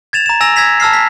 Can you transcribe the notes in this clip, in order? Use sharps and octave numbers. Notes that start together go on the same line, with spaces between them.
G#6 A6 E7 F7
A#5 E7
G#5 E6 A#6 F7
E6 G#6 A#6 B6 F7
A5 E6 F6 C7
B6